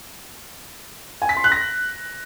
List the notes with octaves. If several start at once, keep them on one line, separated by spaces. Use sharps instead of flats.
G#5
B6
C6
F#6
A#6